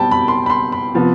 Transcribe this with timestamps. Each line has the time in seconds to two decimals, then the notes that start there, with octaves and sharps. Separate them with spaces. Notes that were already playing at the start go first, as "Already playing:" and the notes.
Already playing: B2 G3 C4 G5 A5 B5
0.11 B5
0.28 C6
0.46 B5
0.50 C6
0.72 B5
0.95 C3 F3 B3